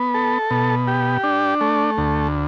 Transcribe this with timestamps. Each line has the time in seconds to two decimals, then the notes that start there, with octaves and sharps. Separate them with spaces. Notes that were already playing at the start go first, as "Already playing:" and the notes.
Already playing: B3
0.14 A4
0.51 B2
0.88 G4
1.23 D4
1.61 A3
1.98 D2